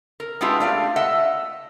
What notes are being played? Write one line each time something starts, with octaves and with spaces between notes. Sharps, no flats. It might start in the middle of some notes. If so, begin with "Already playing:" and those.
A#4
G#3 B3 D4 E4 F4 G4
A3 D5 F5
D#5 E5 F#5